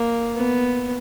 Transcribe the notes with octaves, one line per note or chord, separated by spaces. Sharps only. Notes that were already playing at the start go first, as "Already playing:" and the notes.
Already playing: A#3
B3